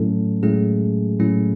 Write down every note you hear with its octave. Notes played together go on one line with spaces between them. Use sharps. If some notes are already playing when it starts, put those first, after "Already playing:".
Already playing: A2 F#3 A3 C#4 E4 A4
A2 F#3 G#3 A3 C#4 E4 G#4
A2 F#3 A3 C#4 E4